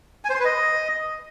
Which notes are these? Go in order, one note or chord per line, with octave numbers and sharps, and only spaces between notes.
G#5
C5
C6
B4
D#5